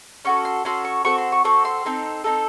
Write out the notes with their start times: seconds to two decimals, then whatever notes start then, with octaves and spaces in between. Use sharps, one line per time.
0.25 C#4 F#4 A4 C#6
0.45 C6
0.65 C#4 F#4 A4 C6
0.85 C#6
1.05 C4 F#4 A4 C#6
1.18 C6
1.32 C#6
1.44 C4 F#4 A4 C#6
1.65 C6
1.85 C4 D#4 A4
2.24 C4 D#4 A4